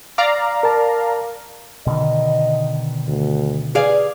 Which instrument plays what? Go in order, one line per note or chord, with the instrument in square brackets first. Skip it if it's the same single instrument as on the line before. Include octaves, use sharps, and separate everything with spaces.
[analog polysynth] D5 F5 A#5
[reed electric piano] A#4 A5
[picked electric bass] B2 D3 D#3 [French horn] D#5
[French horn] D2
[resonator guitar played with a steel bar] G#4 D5 F5 [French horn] B4